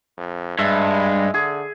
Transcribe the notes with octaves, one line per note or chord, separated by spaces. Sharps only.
F2
G2 G#3 E5
D3 G#4